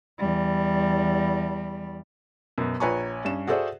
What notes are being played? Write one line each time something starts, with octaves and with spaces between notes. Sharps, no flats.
E2 G3
F#2 B2
A#1 B4 C#5 G#5 A#5 C#6
G2 C#4 E7
F#4 G#4 A4 C5 D5 E5